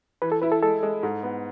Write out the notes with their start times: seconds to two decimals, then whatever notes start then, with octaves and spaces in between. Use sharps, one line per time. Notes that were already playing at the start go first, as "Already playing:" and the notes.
0.22 E3 B4
0.32 A4
0.42 E4 B4
0.52 A4
0.62 G#3 A4
0.83 G#3
1.03 G#2
1.23 B3